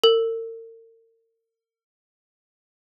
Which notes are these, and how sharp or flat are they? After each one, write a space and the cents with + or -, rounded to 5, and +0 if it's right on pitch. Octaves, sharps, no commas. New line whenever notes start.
A#4 -45